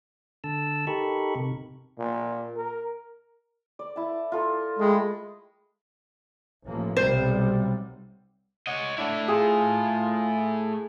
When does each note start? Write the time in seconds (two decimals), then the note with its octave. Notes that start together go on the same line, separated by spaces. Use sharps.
0.44 D3 A5 E6
0.87 D#4 G4 A4 A#4 B5 C#6
1.35 C3
1.99 A#2
2.56 A#4
3.79 D5
3.96 E4 A5
4.32 F4 A4 A#4
4.79 G#3 A3 G5 B5
6.66 A1 F3 A#3
6.97 B1 C3 G3 C5
8.67 C#5 D#5 F#5
8.98 A3 D4 E4
9.28 F4 G#4